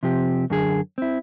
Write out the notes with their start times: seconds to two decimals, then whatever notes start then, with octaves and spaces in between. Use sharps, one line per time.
0.03 C3 F3 C4 G4
0.50 F#2 D3 G#4
0.98 C4 E4